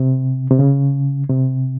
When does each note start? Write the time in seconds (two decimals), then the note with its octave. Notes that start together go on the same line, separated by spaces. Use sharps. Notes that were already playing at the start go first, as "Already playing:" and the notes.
Already playing: C3
0.50 C3
0.59 C#3
1.30 C3